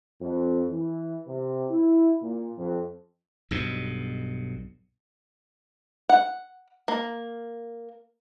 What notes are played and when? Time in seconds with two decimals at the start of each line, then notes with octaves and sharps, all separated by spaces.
0.20 F2
0.70 E3
1.27 C3
1.69 E4
2.22 A#2
2.57 F2
3.51 B1 G2 B2
6.09 F#5
6.88 A#3